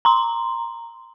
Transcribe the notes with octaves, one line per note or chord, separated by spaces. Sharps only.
A#5 C6